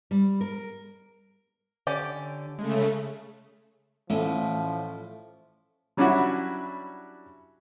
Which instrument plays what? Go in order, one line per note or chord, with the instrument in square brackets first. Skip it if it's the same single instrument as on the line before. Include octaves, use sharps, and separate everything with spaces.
[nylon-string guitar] G3
A#4
[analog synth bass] D3 [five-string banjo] C#4 G4 D5
[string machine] C#3 A3 [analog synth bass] G#3
[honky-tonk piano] A1 [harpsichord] A2 A3 C#4 [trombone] F3
[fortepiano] F#3 G3 C#4 D4 E4 F#4